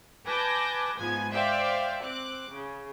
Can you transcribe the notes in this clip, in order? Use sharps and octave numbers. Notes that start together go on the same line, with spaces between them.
B4 G#5 A5 D6 G6 A#6
G#2 F3 B3 G#5
C5 D5 E5 F5 G5
C4 D6 F#6
C#3